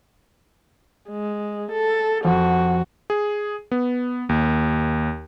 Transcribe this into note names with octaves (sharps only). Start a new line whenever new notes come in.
G#3
A4
F2 F#4
G#4
B3
D#2